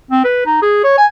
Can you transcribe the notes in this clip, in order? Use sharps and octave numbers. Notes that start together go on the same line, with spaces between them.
C4
B4
D#4
G#4
C#5
G#5